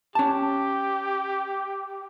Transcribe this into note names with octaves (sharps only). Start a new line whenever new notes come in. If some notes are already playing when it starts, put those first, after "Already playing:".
C#4 G4 A5